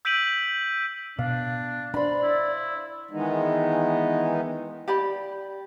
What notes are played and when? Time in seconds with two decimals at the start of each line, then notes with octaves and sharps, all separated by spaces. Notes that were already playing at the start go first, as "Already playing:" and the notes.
0.05 E6 G6 B6 D7 D#7 F#7
1.19 B2 D4 F5
1.94 D4 C5 D5 B5
2.23 E4
3.11 D#3 E3 G#3 B3 D#4
4.88 G4 D5 B5